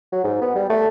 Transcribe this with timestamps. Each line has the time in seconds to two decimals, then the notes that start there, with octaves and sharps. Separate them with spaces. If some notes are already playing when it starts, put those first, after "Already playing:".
0.12 F#3
0.24 G#2
0.41 B3
0.55 G3
0.70 A3